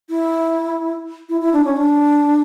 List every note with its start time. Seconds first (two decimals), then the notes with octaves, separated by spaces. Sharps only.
0.10 E4
1.29 E4
1.41 E4
1.53 D4
1.65 C#4
1.77 D4